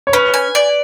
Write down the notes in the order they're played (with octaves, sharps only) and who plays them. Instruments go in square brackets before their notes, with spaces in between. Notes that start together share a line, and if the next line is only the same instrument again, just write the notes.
[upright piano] C#5
[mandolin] C#4 [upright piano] B4
[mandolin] G#5
D5